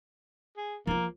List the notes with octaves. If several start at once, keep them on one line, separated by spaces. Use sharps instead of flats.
G#4
F3 A#3 F4